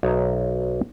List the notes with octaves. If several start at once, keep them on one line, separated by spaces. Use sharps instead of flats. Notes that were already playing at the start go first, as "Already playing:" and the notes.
B1 D#4 C#5 E5 A#5